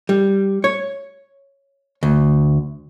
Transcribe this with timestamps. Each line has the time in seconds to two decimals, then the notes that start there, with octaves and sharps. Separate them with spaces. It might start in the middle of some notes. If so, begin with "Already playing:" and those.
0.09 G3
0.64 C#5
2.03 D2